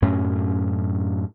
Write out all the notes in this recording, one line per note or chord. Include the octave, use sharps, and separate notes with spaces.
F#2 A2 C#4